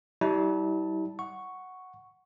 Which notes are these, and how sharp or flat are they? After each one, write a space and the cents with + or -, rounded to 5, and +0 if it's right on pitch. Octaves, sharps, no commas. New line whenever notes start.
G3 -25 E4 -40 A5 +0
F#5 +0 C#6 +0